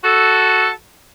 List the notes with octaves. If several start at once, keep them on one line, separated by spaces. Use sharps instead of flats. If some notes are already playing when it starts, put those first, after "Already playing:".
F#4 A4